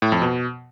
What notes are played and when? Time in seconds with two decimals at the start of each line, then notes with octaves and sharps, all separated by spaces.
0.02 A2
0.12 F2
0.22 B2